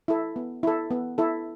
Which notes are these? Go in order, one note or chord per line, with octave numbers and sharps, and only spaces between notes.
E4 A4
B3
E4 A4
B3
E4 A4